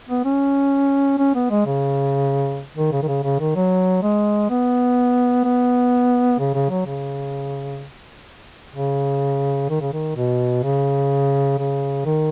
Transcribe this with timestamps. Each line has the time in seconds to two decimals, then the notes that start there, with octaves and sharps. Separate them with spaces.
0.09 B3
0.24 C#4
1.18 C#4
1.35 B3
1.51 G#3
1.66 C#3
2.77 D#3
2.92 C#3
3.03 D#3
3.08 C#3
3.23 C#3
3.40 D#3
3.56 F#3
4.02 G#3
4.50 B3
5.44 B3
6.39 C#3
6.54 C#3
6.70 F#3
6.86 C#3
8.75 C#3
9.70 D#3
9.81 C#3
9.93 D#3
10.16 B2
10.64 C#3
11.58 C#3
12.05 D#3